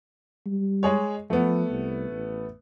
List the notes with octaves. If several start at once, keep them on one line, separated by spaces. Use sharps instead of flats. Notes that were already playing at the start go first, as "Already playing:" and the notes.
G3
G#3 G#4 C#5
F3 A3 B3
C2
A1